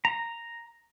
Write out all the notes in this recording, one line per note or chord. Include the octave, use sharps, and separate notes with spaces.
A#5